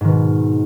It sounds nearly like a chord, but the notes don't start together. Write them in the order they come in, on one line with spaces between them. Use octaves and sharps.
G#2 D#3 B2